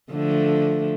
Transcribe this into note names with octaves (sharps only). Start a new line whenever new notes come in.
D3 F3 A3